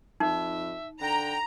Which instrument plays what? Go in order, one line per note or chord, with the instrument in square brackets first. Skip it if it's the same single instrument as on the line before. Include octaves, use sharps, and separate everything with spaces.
[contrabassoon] F2 [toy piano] D#4 [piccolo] E5
[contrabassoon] D3 [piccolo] G5 [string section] A#5